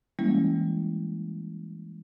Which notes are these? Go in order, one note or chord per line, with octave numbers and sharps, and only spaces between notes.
E3 G3 G#3 A#3 C#4 E4